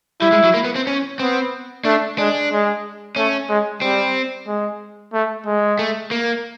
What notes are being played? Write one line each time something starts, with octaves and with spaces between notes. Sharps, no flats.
G3 E4
G#3
F#3
A#3
B3
C4
C#4
B3 C4
A3 D4
G#3 D4
G#3
A3 C#4
G#3
G3 C4
G#3
A3
G#3
A3
A#3